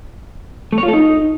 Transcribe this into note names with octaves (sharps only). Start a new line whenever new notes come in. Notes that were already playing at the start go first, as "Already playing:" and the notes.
A3
C#5
F4
A4
D#4